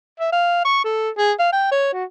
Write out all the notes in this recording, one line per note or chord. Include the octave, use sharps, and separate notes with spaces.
E5
F5
C#6
A4
G#4
F5
G5
C#5
F#4